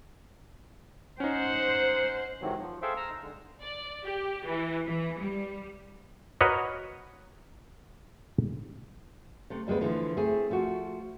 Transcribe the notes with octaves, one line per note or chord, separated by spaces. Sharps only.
C#4 D#4 C5 F#5
G#2 C3 D#3 E3 F#3
F3
G#4 A4 C5 E5 F5 G5
A#5 E6 F6
D#4
D3 G#3
D5
G4
E3
E3
G3
F#4 A#4 B4 C#5 D#5
C3 A3
D2 G3 G#3 B3 B4
D3 E3 F3 A3
A3 C4 E4 G#4
F3 A3 F4 F#4